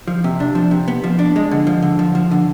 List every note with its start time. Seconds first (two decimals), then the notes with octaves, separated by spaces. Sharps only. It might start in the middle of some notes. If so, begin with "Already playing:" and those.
0.08 F3
0.24 C3
0.40 D4
0.55 F3
0.71 C3
0.88 B3
1.04 F3
1.19 D4
1.36 G#3
1.51 D3
1.67 F3
1.82 D3
1.99 F3
2.15 F3
2.31 D3